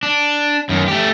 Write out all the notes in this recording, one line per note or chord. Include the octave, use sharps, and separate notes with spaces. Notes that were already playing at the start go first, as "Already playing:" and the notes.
D4
F#2 D#3
A3 G4